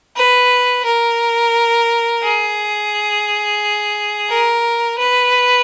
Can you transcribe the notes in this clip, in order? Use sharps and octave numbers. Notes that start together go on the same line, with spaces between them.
B4
A#4
G#4
A#4
B4